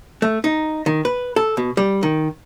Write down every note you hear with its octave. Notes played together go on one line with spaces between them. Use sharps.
A3
D#4
D#3
B4
A4
B2
G3
D#3